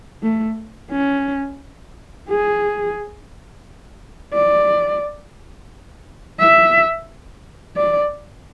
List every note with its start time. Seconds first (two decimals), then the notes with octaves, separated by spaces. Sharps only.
0.23 A3
0.92 C#4
2.29 G#4
4.34 D5
6.40 E5
7.77 D5